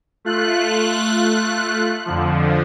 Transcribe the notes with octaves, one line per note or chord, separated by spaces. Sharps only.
A3 F4 F#6
F2 D3 F3